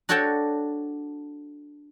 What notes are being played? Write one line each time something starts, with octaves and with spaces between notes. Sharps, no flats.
D4 F#4 A4 C#5 G5 A5